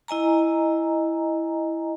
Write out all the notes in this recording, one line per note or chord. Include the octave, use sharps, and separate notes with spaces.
E4 D#5 G#5 A#5